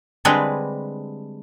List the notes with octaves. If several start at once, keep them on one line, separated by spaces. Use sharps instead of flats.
D3 G3 G#3 C4 G#4 B4